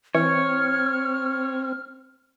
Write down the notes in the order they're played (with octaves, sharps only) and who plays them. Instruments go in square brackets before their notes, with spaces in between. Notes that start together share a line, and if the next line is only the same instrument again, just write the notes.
[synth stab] E3 [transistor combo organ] C4 [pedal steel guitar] C#5 [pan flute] F6